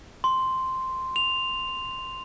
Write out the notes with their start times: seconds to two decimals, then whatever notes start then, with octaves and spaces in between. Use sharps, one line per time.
0.24 C6
1.16 F7